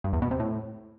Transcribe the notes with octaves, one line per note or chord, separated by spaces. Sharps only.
G2
E2
B2
C3
A2